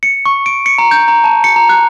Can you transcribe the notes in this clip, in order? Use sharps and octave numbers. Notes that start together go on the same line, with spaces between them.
C#7
C#6
D7
C#7
A#5
G6
A#5
A5
C#7
A#5
F#6